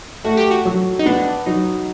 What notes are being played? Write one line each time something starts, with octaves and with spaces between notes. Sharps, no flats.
A3 F#4
G4
F#4
F#3
D#4
B3 D4
F#3 D#4